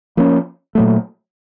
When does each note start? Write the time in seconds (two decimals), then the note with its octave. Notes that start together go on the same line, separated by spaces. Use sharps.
0.17 F3 A#3 C#4
0.75 A#2 F#3 A3